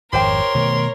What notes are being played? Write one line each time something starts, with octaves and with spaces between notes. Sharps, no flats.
G#1 F2 G4 A#4 C5 C#5 G5 C6
B2 D#3 A3